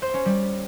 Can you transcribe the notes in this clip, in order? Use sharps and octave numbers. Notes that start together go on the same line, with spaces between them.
C5
C#4
G3